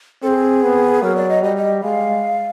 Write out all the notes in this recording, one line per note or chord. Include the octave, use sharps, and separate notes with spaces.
C4 G#4 A4
B3
F#3 A#4
D5
D#5
G3 D#5
D#5
G#3 F5